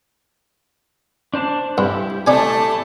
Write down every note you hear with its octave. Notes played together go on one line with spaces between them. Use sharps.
D4 C5 A5
G2 E4 G4
A3 D#4 D5 G#5 A5